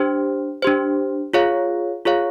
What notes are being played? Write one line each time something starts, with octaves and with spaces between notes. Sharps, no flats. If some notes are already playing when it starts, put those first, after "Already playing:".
Already playing: D4 G4 C5
D4 G4 C5
F4 G#4 C#5 F5
F4 G#4 C#5 F5